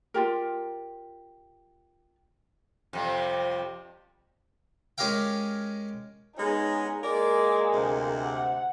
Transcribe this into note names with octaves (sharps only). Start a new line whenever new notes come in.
F4 G4 A#4
F2 C3 G3
G#3 C#4 G4 A#4 F5 G5
G#3 B3 C#4 D#4 G#4
G#3 A#3 A#4 D5
D2 C3
F#5